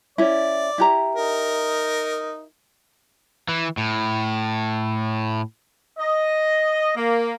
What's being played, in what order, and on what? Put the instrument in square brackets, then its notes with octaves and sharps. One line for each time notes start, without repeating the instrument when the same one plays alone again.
[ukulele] C#4 E4 [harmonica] D5
[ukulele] E4 G4 A#5
[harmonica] D#4 A#4
[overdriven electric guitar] E3
A2
[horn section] D#5
A#3